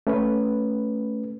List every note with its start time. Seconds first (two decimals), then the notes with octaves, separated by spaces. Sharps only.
0.07 A3 C#4 B4